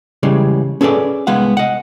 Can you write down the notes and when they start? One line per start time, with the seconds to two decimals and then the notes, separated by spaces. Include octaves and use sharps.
0.23 C#3 E3 G3 G#3
0.81 C#4 G#4 A4 B4 D5
1.27 C2 G#3 B3 F5 F#5
1.57 D#5 F#5